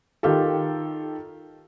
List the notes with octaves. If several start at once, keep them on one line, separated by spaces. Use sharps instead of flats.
D#3 F4 G4 A4